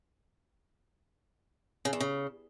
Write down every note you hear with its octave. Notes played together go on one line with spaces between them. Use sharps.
C#3
E2
C#3